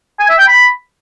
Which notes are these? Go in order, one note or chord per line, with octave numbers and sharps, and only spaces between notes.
G#5
E5
G5
B5